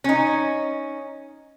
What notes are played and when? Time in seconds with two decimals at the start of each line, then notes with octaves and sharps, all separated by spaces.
0.04 C#4 D#4